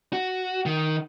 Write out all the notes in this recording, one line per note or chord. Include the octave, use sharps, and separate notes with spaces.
F#4
D#3